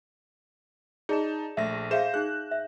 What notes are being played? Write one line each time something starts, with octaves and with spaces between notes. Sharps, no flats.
D#4 G#4 D5 A5 E7
A#1 A3 E5 A#6
G#4 C5 E5 F5 G6 E7
D#4 G#4 F#6
E5